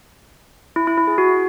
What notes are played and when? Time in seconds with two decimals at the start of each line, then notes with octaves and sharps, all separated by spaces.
0.76 E4
0.87 E4
0.98 E4
1.07 G#4
1.18 F#4